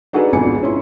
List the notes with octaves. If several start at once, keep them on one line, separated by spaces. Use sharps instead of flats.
D4 D#4 F#4 G#4 A4 B4
G#1 F2 B2 D4 G#5 C#7
C#4 E4 C6